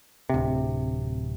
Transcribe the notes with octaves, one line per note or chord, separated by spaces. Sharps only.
D1 C3